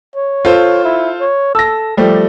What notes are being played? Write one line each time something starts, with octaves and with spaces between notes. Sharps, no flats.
C#5
F4 A4 C5
E4
C#5
A4 E6 A#6
F3 G3 A3 G4